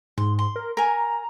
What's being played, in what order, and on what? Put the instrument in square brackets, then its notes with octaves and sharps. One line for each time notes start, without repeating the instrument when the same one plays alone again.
[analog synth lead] G#2 [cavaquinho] C6
[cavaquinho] C6
[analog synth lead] A#4
[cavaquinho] A#4 G#5 [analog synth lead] A#5